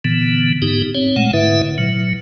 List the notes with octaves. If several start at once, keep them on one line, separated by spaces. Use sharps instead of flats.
A#2 D3 E3 B3
G#2 B3 D#4 G4
C4 C#5
A#2 G#3 A3 F#5
G#2 D3 E4 B4 E5
A#2 F#3